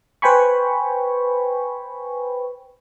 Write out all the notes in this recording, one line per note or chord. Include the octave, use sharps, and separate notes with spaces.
B4 C5 G5 G#5 B5 C#6